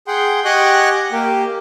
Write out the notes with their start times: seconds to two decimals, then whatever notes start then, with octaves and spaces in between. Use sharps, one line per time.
0.07 G#4 F#5 G5 C6
0.45 G4 D#5 F#5 G#5 C#6 F#6
1.12 A#3 G4